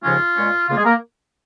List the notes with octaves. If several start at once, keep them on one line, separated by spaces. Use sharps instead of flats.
D#2 C#3 F3 G#3 C#4 F4
A#2 G#3 C#4
C#2 C#3 A#3 F4
G#3 G#4
A#3 A#4